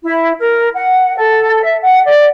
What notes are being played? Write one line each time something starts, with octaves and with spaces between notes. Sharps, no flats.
E4
A#4
F#5
A4
E5
F#5
D5